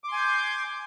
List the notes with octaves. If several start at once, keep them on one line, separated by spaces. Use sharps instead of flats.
G#5 C6 D6 G6